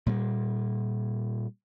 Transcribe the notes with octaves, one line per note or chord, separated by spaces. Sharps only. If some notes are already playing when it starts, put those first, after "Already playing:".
A#2 G3 G#3 A#3